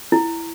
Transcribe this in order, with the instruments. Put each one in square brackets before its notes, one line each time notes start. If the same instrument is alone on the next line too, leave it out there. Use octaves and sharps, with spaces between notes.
[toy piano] E4